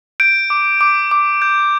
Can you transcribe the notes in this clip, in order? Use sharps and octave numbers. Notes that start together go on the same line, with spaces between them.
G6 D7
D6
D6
D6
G6